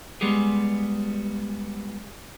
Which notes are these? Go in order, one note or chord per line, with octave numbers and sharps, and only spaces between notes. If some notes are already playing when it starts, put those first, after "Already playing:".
G3 G#3 B3 G4 G#4